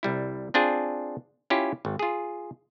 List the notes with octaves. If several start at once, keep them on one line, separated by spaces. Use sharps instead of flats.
C2 G3 E4
C4 D4 F4 G#4
C#4 E4 F4 G4
G#1
F4 G#4